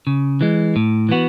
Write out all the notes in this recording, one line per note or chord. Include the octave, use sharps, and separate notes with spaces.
C#3
E3 G#3
A2
E3 B3 F#4